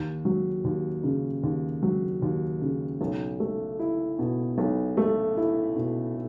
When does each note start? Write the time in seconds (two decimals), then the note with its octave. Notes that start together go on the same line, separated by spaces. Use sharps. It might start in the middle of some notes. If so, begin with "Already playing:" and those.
Already playing: D#2
0.25 F#3
0.64 D#2
1.04 C#3
1.43 D#2
1.83 F#3
2.22 D#2
2.61 C#3
3.01 B1
3.40 A3
3.80 E4
4.19 B2
4.58 B1
4.97 A3
5.37 E4
5.76 B2